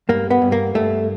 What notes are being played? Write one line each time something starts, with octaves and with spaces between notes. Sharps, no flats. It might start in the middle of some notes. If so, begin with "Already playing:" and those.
G2 A#3
B3
G2
A#3
G2 A3